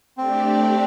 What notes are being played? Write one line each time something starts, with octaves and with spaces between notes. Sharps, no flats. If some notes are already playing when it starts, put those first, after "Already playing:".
A3 C4 D4 G4 D5